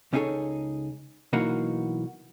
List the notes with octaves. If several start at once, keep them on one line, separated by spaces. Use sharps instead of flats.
C#2 C#4 D#4 G#4 A4 C#5
B1 E3 A#3 D#4 F#4 F#5